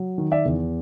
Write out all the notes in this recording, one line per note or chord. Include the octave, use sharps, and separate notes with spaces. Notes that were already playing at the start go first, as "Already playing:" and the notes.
Already playing: F#3
D#3
D5 E5
E2